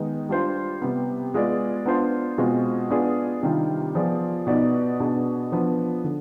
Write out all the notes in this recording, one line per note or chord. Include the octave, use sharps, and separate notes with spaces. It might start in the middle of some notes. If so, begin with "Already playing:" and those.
Already playing: D#3 G#3 B3 D#4
G3 D4 F4 C5
C3 G3 B3
G#3 B3 F4 G#4 D5
B3 D4 F4 C5
B2 G#3 C4 F4 G#4
B3 D4 F4 G#4 D5
C3 D#3 G3 D4 F4
F3 B3 F4 G#4 D5
B2 B3 D#4 B4 D5
B2 B3 D4 G#4
F3 B3 D4
D3